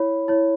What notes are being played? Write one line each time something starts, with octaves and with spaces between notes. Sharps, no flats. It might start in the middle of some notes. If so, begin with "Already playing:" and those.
Already playing: E4 C#5 B5
E4 C#5